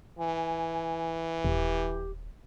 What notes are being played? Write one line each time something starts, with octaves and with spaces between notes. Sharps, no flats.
E3 G#5
D#1 G4